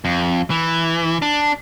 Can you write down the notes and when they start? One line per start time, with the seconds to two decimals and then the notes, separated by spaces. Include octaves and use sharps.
0.05 F2
0.50 E3
1.22 D4